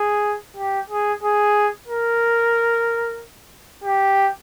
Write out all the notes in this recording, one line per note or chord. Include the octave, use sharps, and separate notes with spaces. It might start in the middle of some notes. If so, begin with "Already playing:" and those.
Already playing: G#4
G4
G#4
G#4
A#4
G4